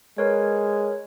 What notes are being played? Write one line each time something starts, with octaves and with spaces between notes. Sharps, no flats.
G#3 A#4 B4 C#5